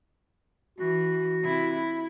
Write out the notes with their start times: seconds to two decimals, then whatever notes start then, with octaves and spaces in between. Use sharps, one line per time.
0.78 E3 F#4
1.42 C3 E4
1.73 E4